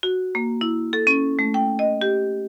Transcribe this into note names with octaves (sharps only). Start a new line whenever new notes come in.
F#4
A#3
E4
A4
C#4
A3
G5
D#5
G4